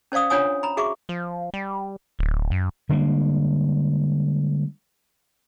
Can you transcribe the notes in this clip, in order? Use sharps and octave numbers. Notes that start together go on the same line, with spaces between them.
C#4 C5 D5 F5 D#6
D4 F4 C#5 F#5 G#5 D#6
A#5 B5
F#4 G#4 E5 C#6 D6
F3
G3
D1
F#2
D3 G3 G#3 A#3